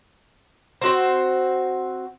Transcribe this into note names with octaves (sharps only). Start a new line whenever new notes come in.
C4 F#4 C5